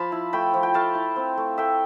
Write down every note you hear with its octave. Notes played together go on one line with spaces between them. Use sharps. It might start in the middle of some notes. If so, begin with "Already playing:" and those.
Already playing: F3 F5 A5 B5
E4
A3 G5 B5
F3
G5
A3 F5 A5
E4
C4
A3
A3 E5 G5